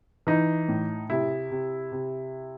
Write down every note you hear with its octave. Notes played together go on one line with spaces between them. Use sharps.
E3 D#4
A2
C3 E4
C3
C3